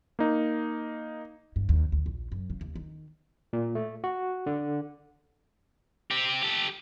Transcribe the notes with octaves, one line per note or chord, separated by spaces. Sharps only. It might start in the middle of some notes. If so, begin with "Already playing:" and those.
A#3 D#4
G2
D#2
D2
A#1
F#2
C#3
D#2
D#3
A#2
A3
F#4
D3
C4 G4
G4 A4